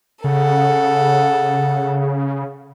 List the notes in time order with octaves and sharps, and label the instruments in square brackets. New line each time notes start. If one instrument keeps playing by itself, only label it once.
[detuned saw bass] C#3 [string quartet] A4 F#5